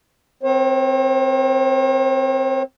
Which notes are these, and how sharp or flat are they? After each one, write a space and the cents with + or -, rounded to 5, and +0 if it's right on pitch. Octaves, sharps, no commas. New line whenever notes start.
C4 -5 A#4 +35 C#5 -45